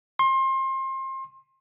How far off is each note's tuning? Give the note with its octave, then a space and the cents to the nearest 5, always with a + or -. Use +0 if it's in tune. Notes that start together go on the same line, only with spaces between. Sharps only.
C6 +30